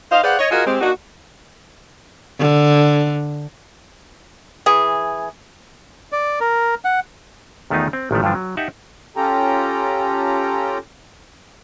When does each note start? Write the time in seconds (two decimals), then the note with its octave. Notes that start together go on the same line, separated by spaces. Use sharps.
0.12 D#4 C5 D#5 F5
0.23 G#4 B4 C5 D5 F5 F#5
0.39 C#5 D#5
0.51 F4 F#4 G#4 A#4 D#5
0.66 G#3 C4 G4
0.81 A#3 D4 D#4 F#4
2.40 D3
4.66 E3 G#4
6.12 D5
6.41 A#4
6.85 F#5
7.70 E2 D#3 A3 B3 D#4 F4
7.93 C4
8.11 A1 D#3 F3 A3
8.23 G2 D3 E3 F3 D4
8.35 F#3
8.57 D#4 G4 E5 F#5 A5
9.16 C#4 F4 G4 A4 G5 A#5